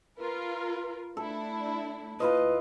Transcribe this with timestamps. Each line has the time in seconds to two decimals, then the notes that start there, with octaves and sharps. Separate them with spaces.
0.18 F4 A#4 B4
1.17 A3 D4 E4 A4
2.20 D#2 E4 F4 B4 D#5